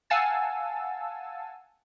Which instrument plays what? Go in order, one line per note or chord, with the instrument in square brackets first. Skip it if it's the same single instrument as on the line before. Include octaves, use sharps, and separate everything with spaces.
[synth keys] F5 F#5 G#5 A5 E6 A6